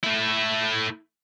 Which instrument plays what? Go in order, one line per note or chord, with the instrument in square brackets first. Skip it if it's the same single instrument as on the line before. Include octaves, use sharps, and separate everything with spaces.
[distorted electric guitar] A3 E4